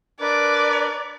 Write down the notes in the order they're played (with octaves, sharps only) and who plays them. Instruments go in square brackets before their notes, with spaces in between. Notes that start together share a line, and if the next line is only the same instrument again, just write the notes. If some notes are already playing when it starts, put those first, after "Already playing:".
[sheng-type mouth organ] D4 A#4 B4 [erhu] D5